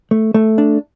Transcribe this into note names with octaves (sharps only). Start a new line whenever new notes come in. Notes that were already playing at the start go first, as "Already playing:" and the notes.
A3
A3
D4